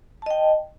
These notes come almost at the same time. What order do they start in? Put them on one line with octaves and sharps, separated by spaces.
A5 D#5 G5